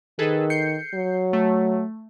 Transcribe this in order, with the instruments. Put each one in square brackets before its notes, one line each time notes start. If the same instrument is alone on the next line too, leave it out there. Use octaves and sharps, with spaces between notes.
[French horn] D#3 [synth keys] G#4 A4 B4
[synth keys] G6 C7 C#7
[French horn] F#3
[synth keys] A3